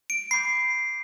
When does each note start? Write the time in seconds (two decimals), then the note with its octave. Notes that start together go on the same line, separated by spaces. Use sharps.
0.10 D7
0.31 B5 D6 G6 C7